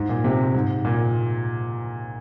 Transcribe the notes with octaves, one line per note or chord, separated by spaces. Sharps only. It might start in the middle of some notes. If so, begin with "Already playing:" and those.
Already playing: G#2
A#2
C3
G#2
A#2